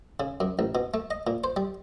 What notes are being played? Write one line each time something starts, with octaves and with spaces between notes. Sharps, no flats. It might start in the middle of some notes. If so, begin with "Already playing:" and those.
C#3
F#2
A1
B2
A3
D#5
A#2
C5
G3